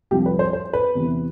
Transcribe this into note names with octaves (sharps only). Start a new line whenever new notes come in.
C2 C3 F3 G4
B4
C5
C5
B4
E2 C3 E3